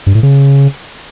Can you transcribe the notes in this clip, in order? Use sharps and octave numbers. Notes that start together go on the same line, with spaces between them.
G2
A2
C#3